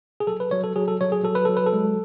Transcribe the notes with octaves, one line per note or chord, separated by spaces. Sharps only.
G#4
F#3 A4
B4
F#3 C#5
A4
F#3 G#4
A4
F#3 C#5
G#4
F#3 A4
B4
F#3 A4
B4
A4
G#3